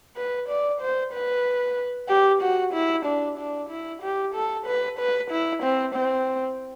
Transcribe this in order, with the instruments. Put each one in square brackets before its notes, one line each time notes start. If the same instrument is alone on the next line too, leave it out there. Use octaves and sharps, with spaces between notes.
[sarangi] B4
D5
C5
B4
G4
F#4
E4
D4
D4
E4
G4
A4
B4
B4
E4
C4
C4